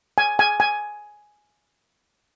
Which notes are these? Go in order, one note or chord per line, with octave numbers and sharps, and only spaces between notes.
G#5
G#5
G#5